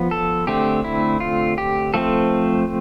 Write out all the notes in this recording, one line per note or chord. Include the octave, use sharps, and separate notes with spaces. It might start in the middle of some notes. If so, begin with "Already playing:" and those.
Already playing: F3 B3
A4
D3 A3 C4 G4
E4
F4
G4
F3 A3 C4 A4